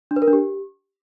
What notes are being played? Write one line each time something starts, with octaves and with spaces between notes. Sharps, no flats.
D4
B4
A#4
D4
G4